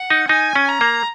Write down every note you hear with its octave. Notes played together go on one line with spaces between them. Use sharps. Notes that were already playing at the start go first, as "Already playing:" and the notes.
Already playing: F#5
D#4
D#4 G#5
C#4
A#5
A#3